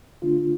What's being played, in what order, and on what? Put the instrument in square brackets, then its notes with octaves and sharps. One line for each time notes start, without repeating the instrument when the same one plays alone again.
[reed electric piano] D3 A3 D4 F4